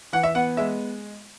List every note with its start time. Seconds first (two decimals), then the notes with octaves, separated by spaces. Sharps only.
0.13 E3 F#5
0.23 E5
0.35 B3 F#5
0.57 G#3 E5